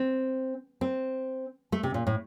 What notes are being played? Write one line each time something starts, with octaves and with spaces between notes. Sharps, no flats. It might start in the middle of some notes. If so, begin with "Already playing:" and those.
Already playing: C4
C4
A3
C3
A#2
A2